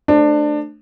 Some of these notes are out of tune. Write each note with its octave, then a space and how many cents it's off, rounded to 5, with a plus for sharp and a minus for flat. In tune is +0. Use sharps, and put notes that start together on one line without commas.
A3 +0 D4 +20 C5 +15